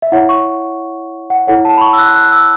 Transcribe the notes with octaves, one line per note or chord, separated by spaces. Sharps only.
E5
E4 C#5 F#5
C#6
F#5
E4 A4 C#5 F#5
A5
B5
C#6
E6
F#6
F#6
E6